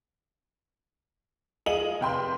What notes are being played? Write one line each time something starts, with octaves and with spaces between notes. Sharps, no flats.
F4 G#4 D#5 D#7 F#7
F1 G5 C6